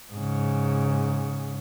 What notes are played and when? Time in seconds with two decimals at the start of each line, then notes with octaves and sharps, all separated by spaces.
0.13 G#2 C#3